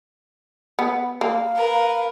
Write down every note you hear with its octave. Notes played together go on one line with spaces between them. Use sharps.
B3
A#3 F5
A#4 B4